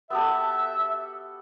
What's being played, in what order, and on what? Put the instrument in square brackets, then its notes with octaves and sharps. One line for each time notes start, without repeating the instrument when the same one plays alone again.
[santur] B3 G4 A4 [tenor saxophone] E5